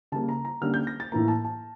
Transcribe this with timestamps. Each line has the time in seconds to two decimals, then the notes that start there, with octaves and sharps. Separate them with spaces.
0.12 C#3 G3 A#3 A5
0.29 A#5
0.45 A#5
0.61 D3 G3 A#3 C#4 F6
0.74 G6
0.87 A#6
1.00 A6
1.12 A2 E3 A#3 A#5
1.28 A5
1.45 A5